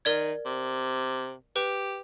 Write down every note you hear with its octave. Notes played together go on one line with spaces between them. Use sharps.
D#3 A#4 D5 G#6
C3
G4 B4